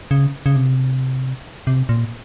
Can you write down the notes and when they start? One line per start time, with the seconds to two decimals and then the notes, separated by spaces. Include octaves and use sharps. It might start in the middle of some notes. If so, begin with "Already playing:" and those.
0.11 C#3
0.46 C#3
0.56 C3
1.67 C3
1.89 A#2